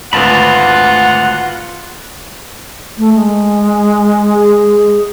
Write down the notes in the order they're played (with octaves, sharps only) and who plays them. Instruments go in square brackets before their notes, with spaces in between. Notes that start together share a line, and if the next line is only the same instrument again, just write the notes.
[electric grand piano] G#1 D2 [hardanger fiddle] F4 [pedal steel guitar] B4 A5 B5 [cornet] F#5
[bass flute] A3
G#3
[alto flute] G#4